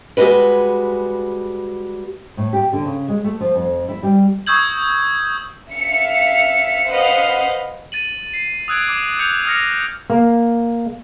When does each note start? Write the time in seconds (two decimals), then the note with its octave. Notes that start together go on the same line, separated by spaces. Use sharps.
0.17 G3 G#3 F#4 B4
2.37 A2
2.53 G4
2.73 D3
2.85 C#3
3.08 G#3
3.24 A3
3.40 F3
3.54 F2
3.89 E4
4.03 G3
4.47 C#6 D#6 E6 G6 G#6 F#7
5.72 E5 F5 C#7
6.88 B4 C5 D#5 F5 F#5
7.92 A6 D#7 F#7
8.34 C7
8.68 D#6 E6 F#6 G#6 D7
8.88 D6
9.19 F#6 G6 C#7 F7
9.45 D#6 F6 A#6 C#7
10.10 A#3